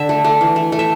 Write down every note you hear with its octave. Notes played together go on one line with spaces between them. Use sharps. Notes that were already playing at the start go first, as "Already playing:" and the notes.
Already playing: D3 E5
A3
A3
E3
A3
A3
E5